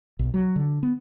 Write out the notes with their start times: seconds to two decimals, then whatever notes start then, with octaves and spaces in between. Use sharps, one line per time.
0.19 B1
0.34 F#3
0.56 D3
0.83 B3